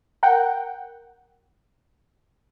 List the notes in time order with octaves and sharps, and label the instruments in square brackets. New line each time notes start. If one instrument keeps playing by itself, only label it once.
[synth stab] A#4 F#5 G5